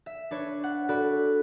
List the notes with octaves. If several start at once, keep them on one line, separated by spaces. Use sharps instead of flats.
E5
D4 B4 C#5
F#5
F#4 A4 B4 D5 B5